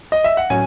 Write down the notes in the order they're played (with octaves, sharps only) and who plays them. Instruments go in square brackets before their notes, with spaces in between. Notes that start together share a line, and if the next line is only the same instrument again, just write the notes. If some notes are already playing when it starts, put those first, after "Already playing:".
[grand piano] D#5
E5
F#5
[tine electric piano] A2 F#3 C#4 F#4 [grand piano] G#5